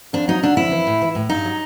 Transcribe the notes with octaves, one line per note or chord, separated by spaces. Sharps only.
F2 D4
F#3 D#4
D3 D4
F2 E4
E3
A2
E3
A2
G2 D#4
F#3